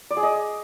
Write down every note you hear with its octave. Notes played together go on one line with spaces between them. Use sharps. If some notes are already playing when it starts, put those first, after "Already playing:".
D5
G#4
D#5